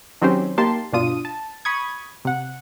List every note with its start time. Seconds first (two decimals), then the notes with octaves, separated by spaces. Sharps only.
0.21 D#3 F#3 C4 C#4 G4 C5
0.58 A#3 D#4 G4 A5 C6
0.93 G2 B2 D4 F4 D#6 D#7
1.25 A5
1.65 B5 C#6 D#6 G#6
2.25 C3 F#5